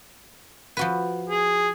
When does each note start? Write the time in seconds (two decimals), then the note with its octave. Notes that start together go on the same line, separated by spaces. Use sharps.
0.77 F3 F#4 B4
1.29 G#4